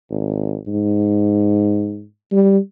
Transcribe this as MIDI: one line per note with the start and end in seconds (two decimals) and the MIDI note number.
0.11 0.56 32
0.67 2.04 44
2.32 2.58 55